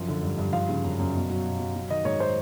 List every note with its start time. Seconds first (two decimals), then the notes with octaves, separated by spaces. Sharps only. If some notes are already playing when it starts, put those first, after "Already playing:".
Already playing: F#2 F3
0.08 D3
0.23 G2
0.38 G2
0.53 F3 F5
0.69 C#3
0.84 F#2
0.99 F#2
1.15 B2
1.30 F#3
1.44 B2
1.60 F#3
1.75 F#3
1.90 D#3 D#5
2.05 G#2 C#5
2.20 C5